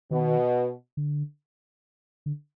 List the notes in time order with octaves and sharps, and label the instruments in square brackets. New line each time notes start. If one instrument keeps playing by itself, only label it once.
[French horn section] B2 [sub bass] D#3
[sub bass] D3
D3